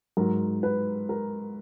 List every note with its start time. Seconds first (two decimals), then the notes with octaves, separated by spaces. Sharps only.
0.17 G#2 F#3 A#4
0.63 B4
1.09 A#4